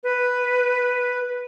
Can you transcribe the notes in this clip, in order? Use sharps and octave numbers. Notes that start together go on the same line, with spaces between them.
B4